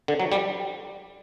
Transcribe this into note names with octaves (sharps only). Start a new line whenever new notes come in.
D3
F#3
G3